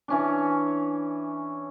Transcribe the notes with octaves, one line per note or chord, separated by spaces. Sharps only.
E3 C#4 D4